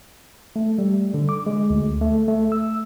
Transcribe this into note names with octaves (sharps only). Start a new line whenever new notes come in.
A3
G3
D3
D6
G#3
D2
A3
A3
E6